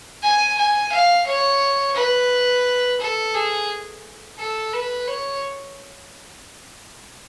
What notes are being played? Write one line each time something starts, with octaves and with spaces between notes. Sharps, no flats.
G#5
G#5
F5
C#5
B4
A4
G#4
A4
B4
C#5